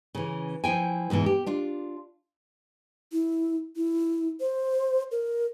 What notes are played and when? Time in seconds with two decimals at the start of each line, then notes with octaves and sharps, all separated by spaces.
0.15 C#3 E3
0.64 F3 E4 G5 G#5
1.10 E2 G#2 B2 E3
1.26 G4
1.46 D4 F4
3.12 E4
3.76 E4
4.40 C5
5.11 A#4